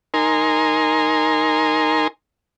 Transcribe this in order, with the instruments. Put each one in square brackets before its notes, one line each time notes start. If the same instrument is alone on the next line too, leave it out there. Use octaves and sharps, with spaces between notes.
[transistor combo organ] D#4 A#4 G#5 C6